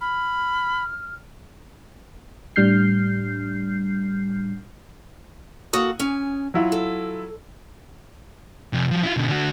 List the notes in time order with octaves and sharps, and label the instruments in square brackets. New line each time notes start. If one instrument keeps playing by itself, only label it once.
[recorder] B5 [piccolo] F6
[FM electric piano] A2 G3 D4 F6 G6 C7
[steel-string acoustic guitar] A#3 F#4 A4 [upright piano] D#6
[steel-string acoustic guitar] C#4 G#5
[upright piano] F#3 E4 F4
[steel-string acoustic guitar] A4
[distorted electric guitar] F2 C3
F3 F#3
E4 F4
B2 D3
D3 F#4